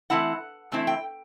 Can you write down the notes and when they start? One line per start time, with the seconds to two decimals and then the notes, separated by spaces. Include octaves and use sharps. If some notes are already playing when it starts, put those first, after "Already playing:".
0.10 E3 A3 C4 E4 F#5
0.72 E3 A3 C4 E4
0.87 G5